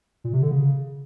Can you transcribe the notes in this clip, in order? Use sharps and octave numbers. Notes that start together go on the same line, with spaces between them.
A#2
C3
D3
C#3